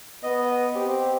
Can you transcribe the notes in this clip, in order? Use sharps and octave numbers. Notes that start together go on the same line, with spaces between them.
B3 D#5
C4 G4